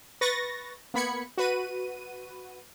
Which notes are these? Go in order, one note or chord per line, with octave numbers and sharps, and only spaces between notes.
B4 C#6 A6 A#6
A#3 B3 B5 G#6 C#7
F#4 B4 D#7